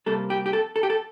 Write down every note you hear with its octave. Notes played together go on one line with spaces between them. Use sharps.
C3 G3 A#3 A4
G4
G4
A4
A4
G4
A4